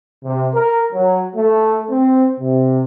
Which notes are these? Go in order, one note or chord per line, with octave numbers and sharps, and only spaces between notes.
C3
A#4
F#3
A3
C4
C3